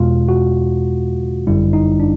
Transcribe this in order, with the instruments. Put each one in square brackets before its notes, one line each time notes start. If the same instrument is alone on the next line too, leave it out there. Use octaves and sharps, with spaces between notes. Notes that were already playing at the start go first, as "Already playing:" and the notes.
Already playing: [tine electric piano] E2 B2 G#3 F4
F#4
G1 F#2 D3 G3 E4
D#4
D4